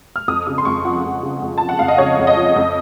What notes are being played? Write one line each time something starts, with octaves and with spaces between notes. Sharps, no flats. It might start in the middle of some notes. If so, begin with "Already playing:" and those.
F6
F2 D#6
C#3 D#6
C6
F2 C#6
F3 F#5
F2
C#3
F2
F3 A5
F#5
F2 F5
D#5
C#3 C#5
F2
D#5
F3
F2